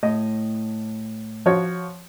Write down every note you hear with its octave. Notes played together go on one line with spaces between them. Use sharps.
A2 D#5
F3 F#4 C#5